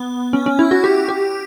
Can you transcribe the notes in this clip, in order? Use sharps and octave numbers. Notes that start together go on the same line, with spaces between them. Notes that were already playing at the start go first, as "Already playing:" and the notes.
Already playing: B3
C#4
C#4
E4
F#4
G4
G4